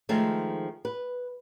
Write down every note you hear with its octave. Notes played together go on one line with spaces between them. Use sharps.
D#3 F3 G#3 A3 D#4
B4